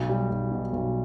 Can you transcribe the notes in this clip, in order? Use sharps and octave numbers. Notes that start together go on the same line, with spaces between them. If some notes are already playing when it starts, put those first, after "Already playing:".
Already playing: B1
G3
B1
B2
B1